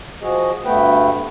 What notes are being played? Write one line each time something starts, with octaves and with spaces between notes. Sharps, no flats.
F3 F#4 G#4 D#5
D2 G2 A3 B3 B4 G5